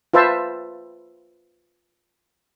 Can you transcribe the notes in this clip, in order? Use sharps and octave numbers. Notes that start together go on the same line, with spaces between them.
F4 B4 C5 E5 A5